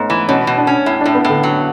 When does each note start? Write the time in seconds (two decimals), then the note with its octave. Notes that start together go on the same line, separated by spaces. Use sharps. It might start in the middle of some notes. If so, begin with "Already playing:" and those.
Already playing: G#2 A3 B3 C#4
0.10 E3
0.28 B2 C#4
0.47 B2
0.57 D4
0.67 C#4
0.86 A2 E4
1.01 A2 D4
1.15 B3
1.25 A2 D3
1.43 F#3